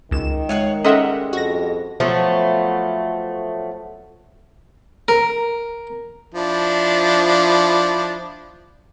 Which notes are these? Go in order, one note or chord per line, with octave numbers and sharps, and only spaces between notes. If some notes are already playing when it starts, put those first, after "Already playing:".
C#2 D#3 E7
G#3 C#5 F5 F#5
G3 G#3 C#4 A4 D#5 E5 F#5 C6
F2 F#4 A#6
F3 F#3 A3 B3
A#4
F3 D4 E4